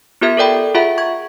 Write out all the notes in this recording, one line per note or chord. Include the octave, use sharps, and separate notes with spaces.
B3 F4 G4 A#4 E5 G#6
A4 A#4 D5 G5 B5
F4 G#4 E5 F#5 B5
C#6 G#6